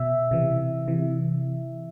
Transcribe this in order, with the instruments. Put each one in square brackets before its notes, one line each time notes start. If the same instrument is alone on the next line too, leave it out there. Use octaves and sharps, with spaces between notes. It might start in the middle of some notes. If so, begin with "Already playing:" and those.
Already playing: [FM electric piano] B2 E5
C3 E3
C3 E3